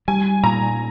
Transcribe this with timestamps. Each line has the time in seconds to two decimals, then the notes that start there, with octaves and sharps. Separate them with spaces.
0.08 G3 G#5
0.43 A#2 A#5